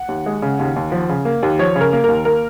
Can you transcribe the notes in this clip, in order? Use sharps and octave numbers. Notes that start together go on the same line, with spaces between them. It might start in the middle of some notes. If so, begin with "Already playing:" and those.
Already playing: F#5
D#2
G#3
C#3
D#2
D#2
F3
C#3
A#3
D#2
F3 C#5
C#3
A#4
A#3
D#2 A#4
A#3 A#4